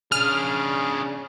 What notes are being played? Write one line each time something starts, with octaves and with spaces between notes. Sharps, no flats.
C#3 D4 G#4 F6